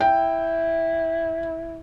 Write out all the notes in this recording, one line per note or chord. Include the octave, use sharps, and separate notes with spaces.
E4 G5